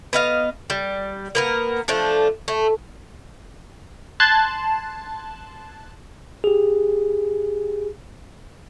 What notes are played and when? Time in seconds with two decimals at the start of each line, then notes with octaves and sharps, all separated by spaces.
0.13 B3 D#5 F5
0.70 G3
1.35 A#3 B3 A#4
1.88 F3 A3 D4
2.48 A3
4.20 A5 C6 F#6 G#6
6.44 G4 G#4